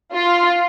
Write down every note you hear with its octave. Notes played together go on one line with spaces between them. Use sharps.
F4